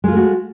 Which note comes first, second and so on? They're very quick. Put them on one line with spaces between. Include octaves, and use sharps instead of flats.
G#3 F4 A3 F#4